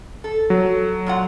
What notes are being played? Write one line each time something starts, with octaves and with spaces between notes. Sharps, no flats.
A4
F#3
A#2 F4 F#5